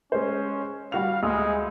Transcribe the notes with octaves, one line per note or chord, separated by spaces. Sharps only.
G#3 C#4 C5
G3 F#4 F5 F7
D2 G#3 D#6